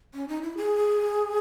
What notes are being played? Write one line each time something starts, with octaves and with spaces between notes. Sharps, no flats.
C#4
D#4
E4
G#4